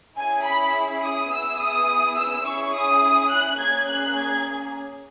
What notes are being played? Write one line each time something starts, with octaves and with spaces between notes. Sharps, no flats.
C#4 E4 G#4 G#5
B5
D#6
B3 E4 G#4 E6
D#6
E6
C#4 E4 G#4 C#6
D#6
F#6
A#3 C#4 G#4 G#6
F#6
G#6